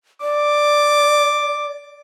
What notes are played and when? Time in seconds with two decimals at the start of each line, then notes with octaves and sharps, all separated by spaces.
0.21 D5 D6